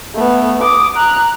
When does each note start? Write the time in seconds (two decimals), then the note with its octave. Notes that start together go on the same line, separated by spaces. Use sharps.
0.15 A3 B3
0.63 D6 D#6
0.97 A#5 F#6